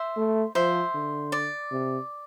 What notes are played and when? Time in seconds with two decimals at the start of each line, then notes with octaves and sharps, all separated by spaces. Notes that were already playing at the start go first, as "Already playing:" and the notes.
Already playing: C5 E5
0.17 A3
0.55 F3 C5 E5
0.94 D3
1.32 D5
1.71 C3